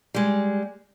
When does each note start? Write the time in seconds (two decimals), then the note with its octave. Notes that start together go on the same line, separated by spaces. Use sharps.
0.14 G3 G#3